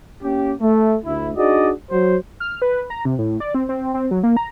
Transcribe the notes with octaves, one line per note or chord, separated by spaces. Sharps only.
A#3 C#4 G4
A3
D2 E4
D4 D#4 F#4 G#4 D5 D#5
F#3 F#4 C5
F6
B4
A#5
C3
A2
D5
C4
C4
C4
F#3
A#3
A#5